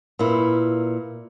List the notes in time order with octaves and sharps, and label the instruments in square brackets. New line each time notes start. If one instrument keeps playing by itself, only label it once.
[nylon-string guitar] A#2 E4 [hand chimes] A#4 B4